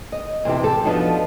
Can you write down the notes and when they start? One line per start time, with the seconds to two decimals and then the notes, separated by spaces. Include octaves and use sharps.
0.12 D#5
0.45 E2 C3 F3 G4
0.63 G4 A4
0.85 F3 B3 D4 D#4 F#4